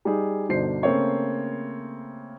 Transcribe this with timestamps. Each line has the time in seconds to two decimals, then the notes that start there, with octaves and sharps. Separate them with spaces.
0.05 G3 D#4 G#4
0.48 G1 B2 D3 D#4 C5 C7
0.83 C#3 A3 A#3 C4 C#5